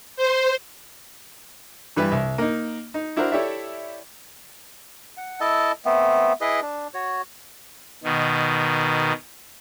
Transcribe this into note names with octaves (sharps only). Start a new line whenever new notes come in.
C5
G2 E3 G3 B4 E5
C2
A#3 D#4
D#4
D4 E4 F#4 A#4 C5
E4 G4 A4 C#5 D5 E5
F#5
E4 A4 D#5 A5
A3 B3 C4
E4 G#4 B4 D#5
D4
F#4 C#5
B2 D#3